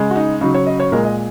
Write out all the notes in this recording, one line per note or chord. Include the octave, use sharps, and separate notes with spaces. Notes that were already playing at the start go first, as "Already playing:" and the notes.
Already playing: C#3 G#3
F#4
D#4
C#3 F#3 D#4
C#5
D#5
C#5
A#2 G#3 A#4
D#5